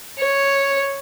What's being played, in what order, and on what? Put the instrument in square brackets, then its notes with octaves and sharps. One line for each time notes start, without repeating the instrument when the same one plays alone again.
[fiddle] C#5